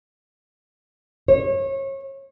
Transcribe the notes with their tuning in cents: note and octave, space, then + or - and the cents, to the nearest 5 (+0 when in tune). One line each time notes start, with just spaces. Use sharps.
C#5 -30